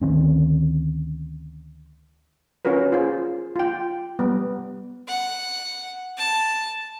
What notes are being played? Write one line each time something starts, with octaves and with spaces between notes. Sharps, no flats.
D2 D#3 C4 C#4
C#4 F4 F#4 A#4 B4
F4 G#4 C5
F4 G5
G3 B3
F#5
A5